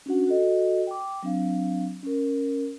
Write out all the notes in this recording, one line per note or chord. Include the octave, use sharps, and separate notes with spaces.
C#4 D4 F#4 F#5
F#4 A4 D#5
G5 D6
F#3 C4 D4 F5
C#4 A#4